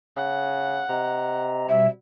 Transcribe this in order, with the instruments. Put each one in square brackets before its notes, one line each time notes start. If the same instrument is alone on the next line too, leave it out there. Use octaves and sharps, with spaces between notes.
[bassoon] C#3 [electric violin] F#5
[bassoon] C3 [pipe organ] D#5 A#5
[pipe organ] B2 G3 [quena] E5